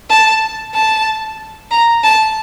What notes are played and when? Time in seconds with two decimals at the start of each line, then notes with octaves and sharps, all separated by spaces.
0.10 A5
0.74 A5
1.71 A#5
2.03 A5